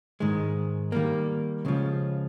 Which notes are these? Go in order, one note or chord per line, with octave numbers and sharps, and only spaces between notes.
G#2 D#3 G#3
D#3 G3 A#3
C#2 C#3 F3